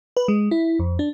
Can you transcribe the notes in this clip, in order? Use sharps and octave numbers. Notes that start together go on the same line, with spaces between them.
B4
G#3
E4
F2
D4